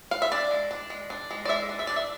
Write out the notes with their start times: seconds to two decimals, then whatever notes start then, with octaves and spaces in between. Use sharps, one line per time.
0.11 F5
0.22 E5
0.32 D4 D5
0.51 G#3
0.71 D4
0.90 G#3
1.10 D4
1.31 G#3
1.45 D5
1.49 G#3 E5
1.69 D4
1.79 E5
1.87 D4 D5
1.96 E5